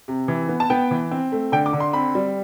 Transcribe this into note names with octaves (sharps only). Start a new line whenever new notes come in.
C3
E3
B3
A5
B3 G5
E3
C4
A3
D3 G5
D6
D3
C6
C4 B5
G3